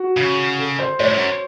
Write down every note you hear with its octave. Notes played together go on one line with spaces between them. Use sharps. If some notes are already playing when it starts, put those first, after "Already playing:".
Already playing: F#4
C#3
A4
C5
A2 C#5
F#2